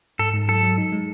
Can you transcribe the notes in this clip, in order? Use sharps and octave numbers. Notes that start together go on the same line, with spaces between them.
G#2 A4
G#2
F#3 A4
F#3
D#4
G#3